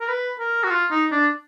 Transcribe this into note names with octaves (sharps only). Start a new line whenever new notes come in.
A#4
B4
A#4
F#4
F4
D#4
D4